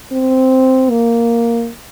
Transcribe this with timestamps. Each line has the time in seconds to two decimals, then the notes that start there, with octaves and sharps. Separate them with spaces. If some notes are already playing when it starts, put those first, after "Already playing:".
0.12 C4
0.90 A#3